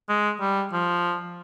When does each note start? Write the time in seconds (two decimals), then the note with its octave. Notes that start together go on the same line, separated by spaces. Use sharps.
0.09 G#3
0.40 G3
0.72 F3